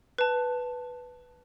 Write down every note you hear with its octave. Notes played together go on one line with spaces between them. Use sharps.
B4 A5